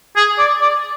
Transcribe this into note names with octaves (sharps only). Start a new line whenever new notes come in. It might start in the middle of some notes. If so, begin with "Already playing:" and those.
G#4
D5
D5